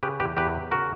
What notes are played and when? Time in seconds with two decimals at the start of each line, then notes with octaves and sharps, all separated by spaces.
0.03 C#3 G4 B4
0.20 E2 G4 B4
0.37 E2 G4 B4
0.54 F#3
0.71 C#3 F#4 A#4